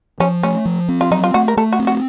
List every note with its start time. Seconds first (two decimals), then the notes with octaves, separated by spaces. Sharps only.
0.20 F3 C#4
0.43 A3 C#4
0.65 F3
0.89 C4
1.01 F4
1.11 F#3 D#4
1.24 F4
1.34 A3 F#4
1.48 A#4
1.57 A3 A4
1.72 F#4
1.79 C4
1.87 F#4